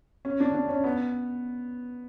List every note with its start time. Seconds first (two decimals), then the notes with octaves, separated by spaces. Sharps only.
0.25 C#4
0.40 D4
0.54 D4
0.69 C#4
0.84 B3